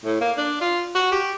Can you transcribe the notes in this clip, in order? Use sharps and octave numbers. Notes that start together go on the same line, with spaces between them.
A2
A#3
D4
F4
F#4
G4